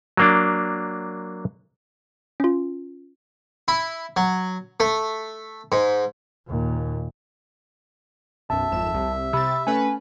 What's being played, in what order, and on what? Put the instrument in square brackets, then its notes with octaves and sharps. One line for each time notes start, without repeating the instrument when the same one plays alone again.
[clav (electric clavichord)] F#3 A#3 D4
[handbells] C#4 F4
[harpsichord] E4
F#3
A3
G#2
[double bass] D#2 A#2
[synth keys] B1 F#2 [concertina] E5 [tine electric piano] A5
[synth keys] G#1 F2 E7
C2
[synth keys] C3 A6 [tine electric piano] B5 E6
[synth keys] A3 C#4 B4 [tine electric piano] G#5